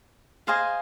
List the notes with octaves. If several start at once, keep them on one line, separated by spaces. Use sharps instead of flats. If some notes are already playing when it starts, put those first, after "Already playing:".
G#4 C5 D#5 F5 G#5